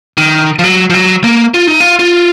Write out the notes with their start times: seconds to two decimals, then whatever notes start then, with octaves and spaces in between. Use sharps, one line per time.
0.18 D#3
0.59 F3
0.64 F#3
0.90 F3
0.94 F#3
1.24 A#3
1.54 F4
1.67 D#4
1.81 F4
1.99 F4